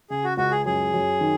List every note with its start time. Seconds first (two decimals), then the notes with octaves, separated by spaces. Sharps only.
0.10 C#3 G#4
0.24 F#4
0.37 C#2 F#4
0.51 G#4
0.66 F#2 G#4
0.94 F#2
1.21 D#3